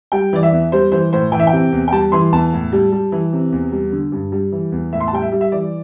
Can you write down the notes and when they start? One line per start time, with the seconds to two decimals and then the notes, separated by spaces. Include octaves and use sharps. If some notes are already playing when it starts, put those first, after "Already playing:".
0.12 G3 G5
0.33 E3 D5
0.43 E5
0.52 E2
0.72 G3 C5
0.92 E3 C5
1.13 A2 C5
1.32 E3 G5
1.40 E5
1.47 G5
1.52 C3
1.73 E2
1.88 G5
1.92 G3 A5
2.12 E3 C6
2.33 E2 A5
2.53 A2
2.73 G3
2.92 G3
3.12 E3
3.33 C3
3.52 E2
3.72 G3
3.92 D3
4.12 G2
4.32 G3
4.52 E3
4.72 E2
4.93 A2 E5
5.00 C6
5.08 A5
5.13 G3 G5
5.22 E5
5.32 G3
5.41 E5
5.52 E3 D5